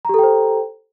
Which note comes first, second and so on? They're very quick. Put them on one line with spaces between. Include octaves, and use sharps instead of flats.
A#5 G4 A4 G5 C5